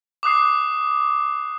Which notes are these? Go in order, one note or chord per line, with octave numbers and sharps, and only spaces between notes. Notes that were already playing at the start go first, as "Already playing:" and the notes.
D6 D#6 F#6 C7